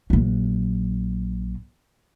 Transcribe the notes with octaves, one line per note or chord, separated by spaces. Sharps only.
A#1 F#3